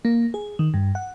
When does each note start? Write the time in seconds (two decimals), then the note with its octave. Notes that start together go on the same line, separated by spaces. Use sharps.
0.05 A#3
0.34 G#4
0.59 D#3
0.74 G2
0.95 F#5